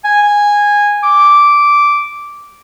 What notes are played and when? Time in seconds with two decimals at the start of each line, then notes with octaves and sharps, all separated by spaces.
0.05 G#5
1.03 D6